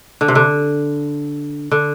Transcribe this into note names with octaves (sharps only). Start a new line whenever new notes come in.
D3
C3
D3
D3